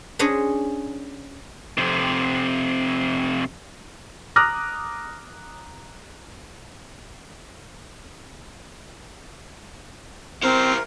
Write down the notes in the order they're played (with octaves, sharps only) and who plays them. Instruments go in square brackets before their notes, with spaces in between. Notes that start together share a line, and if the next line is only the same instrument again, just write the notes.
[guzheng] C#4 D4 G#4 C5 C#5 D#5
[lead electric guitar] F2 C3
[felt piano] A#5 D6 D#6 F6 F#6 A#6
[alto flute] C4 [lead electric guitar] E4 C5 [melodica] A#4